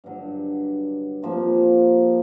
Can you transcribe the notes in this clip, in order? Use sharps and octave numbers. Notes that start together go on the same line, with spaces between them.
G2 D3 F#3
C3 F3 A#3